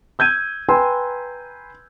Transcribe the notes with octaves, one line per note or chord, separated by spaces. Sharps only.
E6 G6 G#6 D#7
B4 G5 G#5 A#5 C6 E6